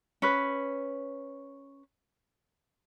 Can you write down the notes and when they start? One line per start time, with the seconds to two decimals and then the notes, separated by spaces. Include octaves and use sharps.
0.22 C#4 B4